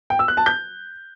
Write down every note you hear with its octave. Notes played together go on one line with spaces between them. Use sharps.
G5
E6
F#6
A5
G6